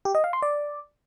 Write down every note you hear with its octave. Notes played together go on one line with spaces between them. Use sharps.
G4
D#5
F5
C6
D5